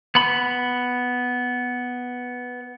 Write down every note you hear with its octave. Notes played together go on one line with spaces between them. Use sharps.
B3 B5